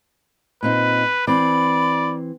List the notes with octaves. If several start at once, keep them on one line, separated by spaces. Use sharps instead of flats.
A#2 C4 D#4 B4
E3 C4 D5 B5